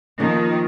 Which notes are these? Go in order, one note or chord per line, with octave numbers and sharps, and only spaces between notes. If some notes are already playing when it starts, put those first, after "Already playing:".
D#3 F3 A#3 F4